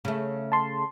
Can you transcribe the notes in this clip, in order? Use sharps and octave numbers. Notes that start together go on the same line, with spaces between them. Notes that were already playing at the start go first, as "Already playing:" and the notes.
C#3 A3
A5 C6